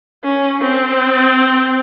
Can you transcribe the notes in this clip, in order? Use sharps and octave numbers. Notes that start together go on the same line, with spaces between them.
C#4
C4